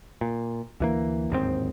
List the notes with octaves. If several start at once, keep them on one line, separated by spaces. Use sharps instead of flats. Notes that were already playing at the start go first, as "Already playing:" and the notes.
A#2
D2 E3 A#3
D1 D#2 G#2 C4